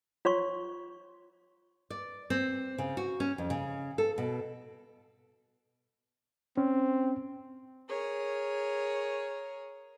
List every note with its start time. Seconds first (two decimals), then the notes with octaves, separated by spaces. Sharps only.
0.25 F4 C#5 C6 C#6
1.90 D5
2.30 C4
2.78 C#3
2.97 F#4
3.20 C#4
3.38 F2
3.50 C#3
3.98 A4
4.18 B2
6.57 C4 C#4
7.88 G#4 A#4 C#5